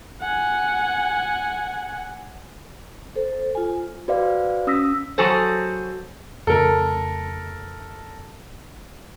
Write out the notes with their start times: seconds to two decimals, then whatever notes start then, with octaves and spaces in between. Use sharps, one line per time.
0.21 F#5 G#5
3.16 A4 C5
3.55 F4 G#5
4.08 F#4 B4 C5 D5 F5
4.67 C#4 D#6 E6 A#6 B6
5.18 F#3 F#4 G#4 A4 C5
6.47 F2 C#3 A3 A4 A#4